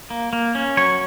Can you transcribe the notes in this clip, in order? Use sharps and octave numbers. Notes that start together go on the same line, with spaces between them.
A#3
A#3
C#4
F#3 C#5